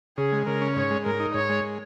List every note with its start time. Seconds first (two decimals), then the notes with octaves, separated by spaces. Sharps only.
0.17 C#3 G#4
0.32 G#3
0.47 C#3 A#4
0.62 C#4
0.76 G#2 C#5
0.91 G#3
1.06 G#2 A#4
1.20 D#4
1.34 G#2 C#5
1.49 G#3